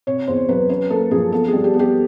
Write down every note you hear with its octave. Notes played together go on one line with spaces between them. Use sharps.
C3 C#5
E2 C5
F#3 B4
C#4 B4
A#3 A4
F3 G#4
B3 A4
G#4
G3
G4
B3
G4